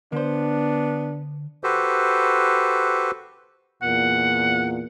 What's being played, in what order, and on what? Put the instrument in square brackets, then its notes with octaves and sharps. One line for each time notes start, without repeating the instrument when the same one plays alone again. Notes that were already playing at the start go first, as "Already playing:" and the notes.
[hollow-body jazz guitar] D3 C5 [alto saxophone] B3 [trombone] D4
[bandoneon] F#4 G4 A4 B4 C5
[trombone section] E2 A#2 [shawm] F#5